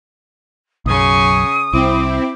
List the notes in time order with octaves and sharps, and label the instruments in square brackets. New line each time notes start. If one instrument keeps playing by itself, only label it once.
[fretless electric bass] B1 F#2 [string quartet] C#3 G#5 C#6 [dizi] D#6
[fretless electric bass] C2 [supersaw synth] C4 E4 [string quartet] D6